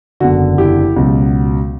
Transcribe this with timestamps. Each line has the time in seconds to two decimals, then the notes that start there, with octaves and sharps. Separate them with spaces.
0.20 F#1 E2 D3 F#4
0.58 E4 G4
0.96 C#2 B2 F#3